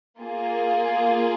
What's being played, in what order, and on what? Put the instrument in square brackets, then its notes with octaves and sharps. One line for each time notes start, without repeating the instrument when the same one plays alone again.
[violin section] A#3 F4 G#4